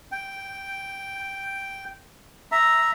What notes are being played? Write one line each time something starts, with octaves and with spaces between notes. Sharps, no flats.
G5
E5 A#5